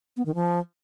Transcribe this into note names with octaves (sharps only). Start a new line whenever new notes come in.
B3
D#3
F3